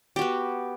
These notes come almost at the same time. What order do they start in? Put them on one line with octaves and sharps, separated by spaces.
G4 F#4 B3